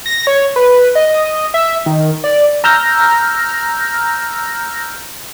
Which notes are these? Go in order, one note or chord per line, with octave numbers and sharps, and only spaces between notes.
A#6
C#5
B4
D#5
E5
D#3
D5
A#5 E6 F6 G6 A#6